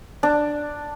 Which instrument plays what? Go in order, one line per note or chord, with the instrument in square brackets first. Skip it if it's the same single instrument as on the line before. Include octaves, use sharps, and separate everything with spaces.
[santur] D4